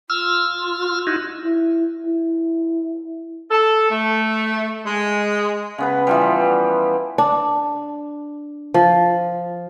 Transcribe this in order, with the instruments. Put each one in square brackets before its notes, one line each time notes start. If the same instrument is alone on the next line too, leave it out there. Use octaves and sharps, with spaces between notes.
[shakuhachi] F4 [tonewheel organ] E6 F6
[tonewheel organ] D#4 E4 F#4
[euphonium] E4
E4
[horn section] A4
A3
G#3
[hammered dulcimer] C#3 B3 B4
E3 F3 G3
[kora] D4
F3